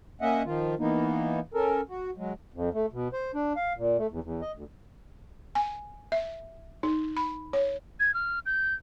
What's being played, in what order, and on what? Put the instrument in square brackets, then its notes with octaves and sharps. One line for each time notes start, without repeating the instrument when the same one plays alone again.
[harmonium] A#3 C#4 D#5 E5 F#5
D#3 F3 F4
E3 A#3 B3 D#4
C#4 A4 A#4
F#4
F#3 G#3
F2
A3
B2
C5
D4
F5
A#2
A3
E2
E2
D#5
D2
[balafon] G#5
E5
D#4
B5
C#5
[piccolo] G#6
F6
G6